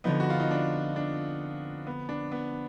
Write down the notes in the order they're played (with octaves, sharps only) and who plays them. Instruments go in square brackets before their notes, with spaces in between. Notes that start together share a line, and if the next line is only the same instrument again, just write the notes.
[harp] F2 D3 F3 [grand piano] B3 D#4
[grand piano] F#4
F4
D#4
D4
D4
B3
D4
B3